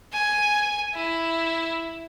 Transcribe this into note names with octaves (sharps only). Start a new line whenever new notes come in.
G#5
E4